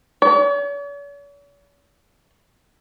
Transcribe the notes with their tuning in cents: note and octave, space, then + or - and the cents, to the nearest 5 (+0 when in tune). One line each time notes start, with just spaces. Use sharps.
C#5 +45